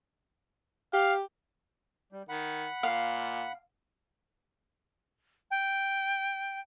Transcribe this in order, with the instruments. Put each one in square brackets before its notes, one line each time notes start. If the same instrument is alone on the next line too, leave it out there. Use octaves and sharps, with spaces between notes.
[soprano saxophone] G4 [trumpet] F5
[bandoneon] G3
[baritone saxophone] D#3 [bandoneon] F#5 B5
[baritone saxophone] A#2 [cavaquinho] F5
[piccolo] G5